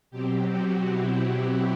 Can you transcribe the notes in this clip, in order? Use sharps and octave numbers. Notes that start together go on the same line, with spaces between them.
B2 F#3 C4 G4
F#4
E4